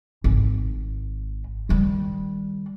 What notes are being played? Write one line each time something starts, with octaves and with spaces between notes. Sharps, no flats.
G#1
D#3 G3